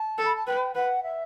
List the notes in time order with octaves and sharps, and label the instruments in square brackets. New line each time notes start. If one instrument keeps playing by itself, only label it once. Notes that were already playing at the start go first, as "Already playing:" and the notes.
Already playing: [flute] A5
[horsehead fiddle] A4
[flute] B5
A5
[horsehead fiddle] B4 [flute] G5
[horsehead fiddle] B4 [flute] F#5
[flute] E5